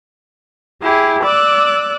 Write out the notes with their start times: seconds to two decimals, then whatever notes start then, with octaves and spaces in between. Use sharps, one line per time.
0.82 E4 G4 G#4
1.22 D5 D6 E6 F#6